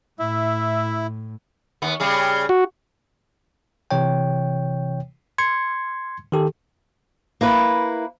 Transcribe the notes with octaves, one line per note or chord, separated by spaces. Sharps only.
A2 E4 E5
D#2 B3
C#3 G3 G#4
F#4
C3 E3 C#5 G5
C6 G#6 C#7
D#3 G4 A4
A#3 E4 B4